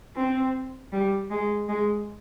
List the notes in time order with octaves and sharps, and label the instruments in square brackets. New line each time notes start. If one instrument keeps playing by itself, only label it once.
[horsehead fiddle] C4
G3
G#3
G#3